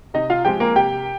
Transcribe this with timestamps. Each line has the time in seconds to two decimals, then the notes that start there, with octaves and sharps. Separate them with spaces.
0.14 C3 D#4 D#5
0.30 F4 F5
0.45 F3 G#3 C4 G4 G5
0.60 A#3 A#4
0.76 C3 G4 G5